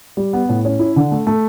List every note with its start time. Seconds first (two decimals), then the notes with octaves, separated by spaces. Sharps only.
0.17 G3
0.33 B3
0.49 A2
0.65 C#4
0.79 E4
0.96 D3
1.12 A3
1.27 A3